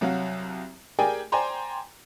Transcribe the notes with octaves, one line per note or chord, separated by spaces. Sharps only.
C2 F#3 F#4 F5
G4 G#4 A#4 D5 G5 G#5
C5 D5 G5 G#5 A#5 C6